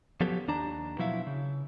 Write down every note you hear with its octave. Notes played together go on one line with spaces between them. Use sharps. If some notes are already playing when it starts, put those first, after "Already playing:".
F3 F#3 B3 C#4 G4 A4
D#2 D4 A5 A#5
B2 F3 F#3 E4 E5 F5
C#3